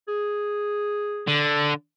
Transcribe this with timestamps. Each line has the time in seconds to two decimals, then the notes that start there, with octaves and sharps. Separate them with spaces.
0.08 G#4
1.28 D3